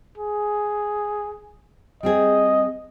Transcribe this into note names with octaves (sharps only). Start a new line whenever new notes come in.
G#4
G3 C4 G#4 D#5